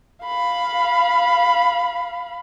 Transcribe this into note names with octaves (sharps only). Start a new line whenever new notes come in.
F5 B5